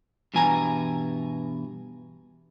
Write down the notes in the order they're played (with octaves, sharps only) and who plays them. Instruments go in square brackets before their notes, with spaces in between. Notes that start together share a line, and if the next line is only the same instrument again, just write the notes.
[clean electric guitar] G2 B2 E3 G#5 A#5